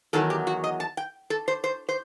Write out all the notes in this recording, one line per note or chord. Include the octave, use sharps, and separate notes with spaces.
E2 D#3 F#3 A4
G4
F#4
D#5
A5
G5
A4
C5
C5
C5